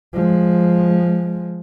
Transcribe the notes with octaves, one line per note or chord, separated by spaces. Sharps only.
F3 G#3